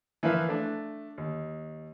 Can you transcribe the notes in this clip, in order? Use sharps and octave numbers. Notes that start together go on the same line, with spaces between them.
E3 F3 E4 A#4 B4 F5
A3 D4
D#2